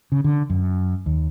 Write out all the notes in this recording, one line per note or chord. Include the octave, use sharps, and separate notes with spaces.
C#3
D3
F#2
D#2